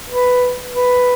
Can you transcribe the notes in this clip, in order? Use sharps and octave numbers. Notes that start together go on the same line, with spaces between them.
B4
B4